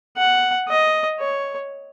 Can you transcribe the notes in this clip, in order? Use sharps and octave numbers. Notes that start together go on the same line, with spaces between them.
F#5
D#5
C#5